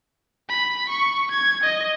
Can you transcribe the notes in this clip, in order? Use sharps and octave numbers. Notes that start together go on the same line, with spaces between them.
B5
C#6
G#6
D#5